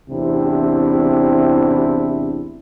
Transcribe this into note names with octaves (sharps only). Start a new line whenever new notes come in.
A1 E2 C3 C4 D4 E4